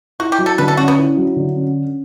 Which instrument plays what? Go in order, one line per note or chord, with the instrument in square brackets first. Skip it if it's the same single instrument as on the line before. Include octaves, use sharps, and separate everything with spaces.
[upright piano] E4 [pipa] F#4
[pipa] G4
[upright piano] F#3
[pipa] A4
[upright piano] D3 [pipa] B4
[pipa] A4
[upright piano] C#4 [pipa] F#4
[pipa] B3
[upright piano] E4
F#3
D3
C#4